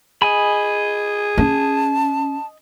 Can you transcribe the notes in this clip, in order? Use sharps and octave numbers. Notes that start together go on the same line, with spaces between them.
G#4 D#5 G#5 B5
C#4 A5